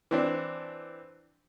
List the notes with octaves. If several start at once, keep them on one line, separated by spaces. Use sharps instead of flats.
E3 C4 D4